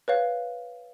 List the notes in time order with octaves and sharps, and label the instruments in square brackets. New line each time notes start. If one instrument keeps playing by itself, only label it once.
[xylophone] B4 C#5 F5